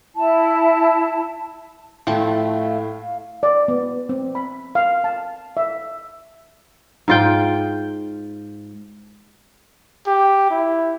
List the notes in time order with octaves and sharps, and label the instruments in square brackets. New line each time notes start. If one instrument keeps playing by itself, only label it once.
[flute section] E4 A5
[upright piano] A2 [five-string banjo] F3 G5 A5 [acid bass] A3 [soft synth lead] F5
[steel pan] D5
B3
C4
B5
F5
A5
E5
[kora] G#2 F4 G5
[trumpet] G4
E4